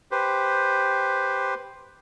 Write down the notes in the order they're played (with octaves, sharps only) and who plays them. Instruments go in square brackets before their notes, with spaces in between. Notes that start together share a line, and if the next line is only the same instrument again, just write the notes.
[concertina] G4 B4 C5